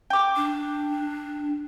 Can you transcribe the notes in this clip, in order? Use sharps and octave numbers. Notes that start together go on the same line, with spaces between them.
G5 D6
D4